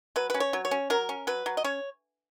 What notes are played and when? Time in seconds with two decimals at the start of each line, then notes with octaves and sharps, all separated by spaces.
0.16 F#3 B4
0.30 C#4 B4
0.40 C#5
0.53 F#3
0.65 C#5
0.71 C#4
0.90 F#3 A#4
1.09 C#4
1.27 F#3 B4
1.46 F#3
1.57 D#5
1.64 C#4 C#5